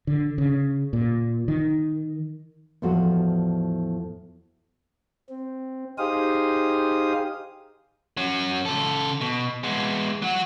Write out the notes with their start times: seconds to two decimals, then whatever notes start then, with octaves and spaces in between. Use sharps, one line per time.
0.07 D3
0.38 C#3
0.93 A#2
1.48 D#3
2.82 E2 A2 F3 F#4 A4 F5
5.29 C4
5.98 D#4 G4 G#4 C5 F5 D#6
8.17 F#3 C#4
8.65 C#3 A4
9.21 B2
9.63 G#3 B3
10.22 F#3 F#4